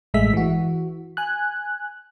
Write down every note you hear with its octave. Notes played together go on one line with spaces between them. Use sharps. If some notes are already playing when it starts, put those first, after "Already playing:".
A1 G2 G#3 A3 E5 B6
E3 F#4
G#5 F#6